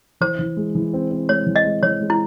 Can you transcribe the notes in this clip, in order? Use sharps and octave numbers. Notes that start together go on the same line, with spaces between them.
E3 C5
E3
G#3
E3
C4
C4
G#3 C#5
E3
D#5
G#3
E3 C#5
G#3
E4